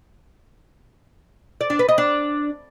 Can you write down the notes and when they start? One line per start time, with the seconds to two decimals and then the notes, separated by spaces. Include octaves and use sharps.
1.61 D5
1.70 D4
1.79 B4
1.89 D#5
1.98 D4